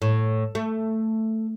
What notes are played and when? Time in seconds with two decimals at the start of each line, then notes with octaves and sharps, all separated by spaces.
0.02 A2
0.55 A3